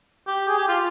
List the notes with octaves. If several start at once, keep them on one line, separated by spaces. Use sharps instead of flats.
G4
G#4
G4
F4